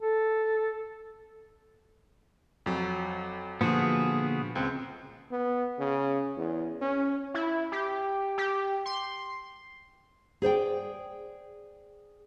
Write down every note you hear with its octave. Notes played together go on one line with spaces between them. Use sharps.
A4
F2 F#3
A#2 D3 F3 B3 F#4 G#4
C#2 C4
B3
C#3
E2
C#4
E4
G4
G4
C6
G#4 C5 D5 G5